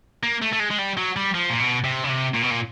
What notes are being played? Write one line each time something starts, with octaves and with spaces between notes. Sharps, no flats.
A#3
A3
A3
G#3
G#3
G3
F#3
G3
F3
A#2
B2
C3
C#3
C3
A#2
B2
A#2